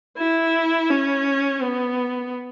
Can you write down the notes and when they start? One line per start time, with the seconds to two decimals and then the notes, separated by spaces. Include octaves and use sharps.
0.18 E4
0.90 C#4
1.62 B3